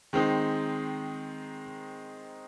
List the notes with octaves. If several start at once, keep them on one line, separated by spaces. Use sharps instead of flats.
D#3 G#3 C4 D#4